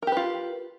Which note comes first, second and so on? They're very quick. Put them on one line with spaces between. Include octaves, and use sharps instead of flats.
A#4 G4 B4 F4